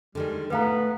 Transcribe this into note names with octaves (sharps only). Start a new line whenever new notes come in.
D3 D#3 G3 G#3
A2 A3 B3 B4 F5 A#5